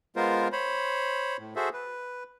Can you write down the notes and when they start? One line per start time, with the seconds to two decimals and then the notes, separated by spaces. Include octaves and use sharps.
0.16 G#3 B3 F4 A#4 C5
0.52 C5 C#5 B5
1.38 A2
1.56 F#4 G#4 A4 C5 E5
1.73 B4